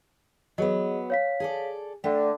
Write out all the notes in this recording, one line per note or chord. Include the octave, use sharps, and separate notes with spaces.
F#3 B3 G#4 C#5 D#5
C#5 F5 B6
G#4 A4 D5
D3 A3 G5